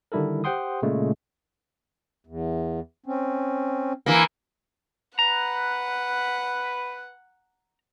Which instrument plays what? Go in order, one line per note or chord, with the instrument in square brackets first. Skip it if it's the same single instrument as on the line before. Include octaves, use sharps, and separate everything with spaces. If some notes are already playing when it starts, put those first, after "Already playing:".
[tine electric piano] D3 D#3 G3 E4 A4 A#4
G4 C5 F#5 G5 C6 D#6
A#2 C#3 G#3 A3
[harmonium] E2
C4 C#4
[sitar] E3 A#3
[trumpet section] B4 [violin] F#5 [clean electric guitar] A#5